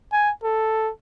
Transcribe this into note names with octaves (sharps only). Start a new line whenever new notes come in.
G#5
A4